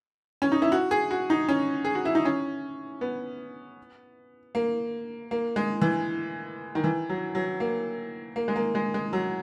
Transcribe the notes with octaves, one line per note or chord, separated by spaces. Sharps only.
C#4
D#4
E4
F#4
G#4
F#4
D#4
C#4
G#4
F#4
E4
D#4
C#4
B3
A#3
A#3
G#3
E3
D#3
E3
F#3
F#3
A#3
A#3
G#3
A#3
G#3
G#3
F#3